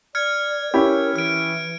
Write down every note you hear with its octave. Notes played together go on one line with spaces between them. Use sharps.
D5 F6 G#6 C#7
C#4 E4 G4 A#4
E3 F6 D7